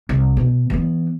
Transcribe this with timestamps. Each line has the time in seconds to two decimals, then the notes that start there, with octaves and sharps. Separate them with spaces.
0.09 C2
0.37 B2
0.70 E3 B3